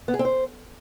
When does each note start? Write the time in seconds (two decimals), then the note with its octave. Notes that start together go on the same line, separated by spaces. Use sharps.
0.08 B3
0.14 G#4
0.19 C4
0.25 C5